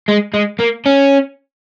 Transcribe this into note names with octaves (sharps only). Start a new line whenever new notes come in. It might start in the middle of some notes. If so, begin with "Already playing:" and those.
G#3
G#3
A#3
C#4